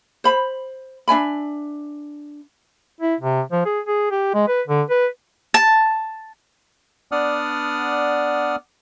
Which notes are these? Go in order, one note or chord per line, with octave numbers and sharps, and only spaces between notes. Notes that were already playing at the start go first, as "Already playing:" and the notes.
C5 B5
D4 E5 G#5 B5
E4
C3
F3
G#4
G#4
G4
G#3
B4
D3
B4
A5
B3 D4 D5 F#5 D#6 F6